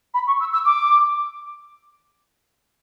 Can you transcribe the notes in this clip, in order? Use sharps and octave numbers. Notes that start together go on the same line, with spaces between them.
B5
C#6
E6
E6
D6